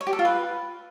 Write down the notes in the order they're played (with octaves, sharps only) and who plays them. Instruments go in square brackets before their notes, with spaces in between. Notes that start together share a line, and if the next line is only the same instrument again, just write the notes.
[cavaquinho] C#5
G4
A4
F4
B4